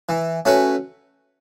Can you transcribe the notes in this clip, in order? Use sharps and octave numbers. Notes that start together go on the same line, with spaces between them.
E3
A3 C#4 F#4 B4